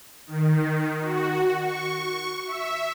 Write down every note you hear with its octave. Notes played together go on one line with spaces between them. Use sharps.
D#3
F#4
C#6
E5